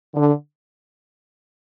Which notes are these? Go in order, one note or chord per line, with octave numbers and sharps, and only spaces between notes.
D3